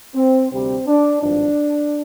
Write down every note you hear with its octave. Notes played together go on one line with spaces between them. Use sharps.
C4
D2 C3 G3 C4
D4
G#1 G2 F3 D4